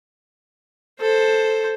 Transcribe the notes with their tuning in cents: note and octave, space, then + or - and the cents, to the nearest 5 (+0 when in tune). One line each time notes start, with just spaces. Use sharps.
A4 +0 C5 +5